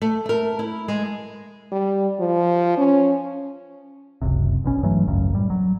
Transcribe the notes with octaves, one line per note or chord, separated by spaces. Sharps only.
A3
A3 A#4
E4
G#3
G3
F3
C#4
F#1 C#2 C3
A#1 B2 C#4
G2 E3 F#3 A3
G#1 C#2 F#2 C#3
A2 G3
F#3